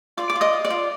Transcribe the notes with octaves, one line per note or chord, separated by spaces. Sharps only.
F4 D5 D6
D6
F4
D#5 D#6
F4
D5 D6
F4